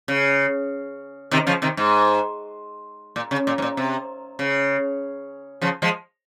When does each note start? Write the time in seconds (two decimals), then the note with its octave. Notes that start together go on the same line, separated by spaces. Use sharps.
0.08 C#3
1.31 C3 D#3
1.47 C#3 F3
1.62 C3 D#3
1.77 G#2
3.16 A#2
3.31 C#3
3.47 A#2
3.58 G#2
3.62 A#2
3.77 C3
4.39 C#3
5.61 C#3 F3
5.82 F3 G#3